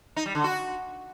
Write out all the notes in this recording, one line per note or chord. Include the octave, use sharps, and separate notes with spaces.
D#4
G3
D3
F#4